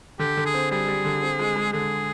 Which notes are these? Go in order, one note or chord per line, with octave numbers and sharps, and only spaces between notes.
D3 G4
D3
G#4
C4
G3 G#4
G3
D3
C4
G#3
G#3
D3 G#4